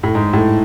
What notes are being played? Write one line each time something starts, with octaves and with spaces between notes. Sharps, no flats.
A2
G#2
A2